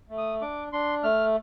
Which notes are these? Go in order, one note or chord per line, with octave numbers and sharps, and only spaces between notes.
A3
D#6
D4 D6
D4 C6
A3 F6